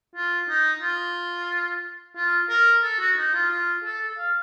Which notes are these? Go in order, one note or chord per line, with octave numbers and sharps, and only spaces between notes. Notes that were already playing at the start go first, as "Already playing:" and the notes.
F4
D#4
F4
F4
A#4
A4
F#4
D#4
F4
F4
A4
F5